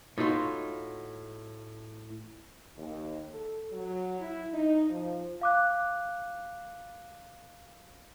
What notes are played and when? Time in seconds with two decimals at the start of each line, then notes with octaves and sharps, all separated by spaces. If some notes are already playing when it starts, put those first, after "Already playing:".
0.18 A2 D#4 F4 F#4 C6
2.77 D#2
3.31 A4
3.72 F#3
4.20 E4
4.54 D#4
4.90 F3
5.41 F5 D6 F#6